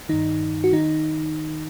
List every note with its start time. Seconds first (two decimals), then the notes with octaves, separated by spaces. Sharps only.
0.09 G2 D#3 D#4
0.64 F#4
0.73 D#3 D#4